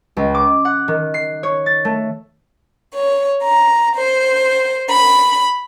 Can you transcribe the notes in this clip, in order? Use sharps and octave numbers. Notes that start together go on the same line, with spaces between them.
C#2
D6
F#5
D#3
C7
C#5
A6
A3
C#5
A#5
C5
B5